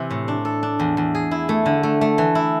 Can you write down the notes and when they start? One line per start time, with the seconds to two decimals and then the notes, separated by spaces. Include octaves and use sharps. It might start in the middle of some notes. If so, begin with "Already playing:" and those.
Already playing: C3 E3
0.11 A2
0.28 D4
0.45 A4
0.63 D4
0.80 E2
0.97 E2
1.15 G#4
1.31 E4
1.49 A3
1.66 D3
1.83 A3
2.01 A3
2.18 E3
2.35 E4